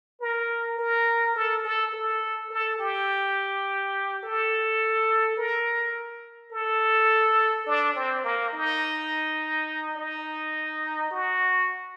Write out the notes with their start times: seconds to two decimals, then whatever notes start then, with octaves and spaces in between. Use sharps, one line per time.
0.21 A#4
0.78 A#4
1.36 A4
1.65 A4
1.94 A4
2.50 A4
2.79 G4
4.23 A4
5.37 A#4
6.51 A4
7.66 D4
7.95 C4
8.24 A#3
8.53 D#4
9.96 D#4
11.11 F#4